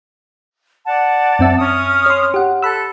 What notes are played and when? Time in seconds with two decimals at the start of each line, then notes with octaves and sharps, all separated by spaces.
0.86 D5 F#5 A5
1.39 F#2 C4 E5
1.59 C#4 D#6 F6
2.06 C#5 C6
2.34 G4 F#5
2.63 A4 B5 E6 F#6